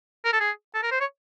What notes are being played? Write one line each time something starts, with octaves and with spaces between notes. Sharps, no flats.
A#4
A4
G#4
A4
A#4
C5
C#5